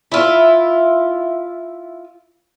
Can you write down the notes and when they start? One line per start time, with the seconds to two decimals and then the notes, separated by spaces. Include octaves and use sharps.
0.12 E4 F4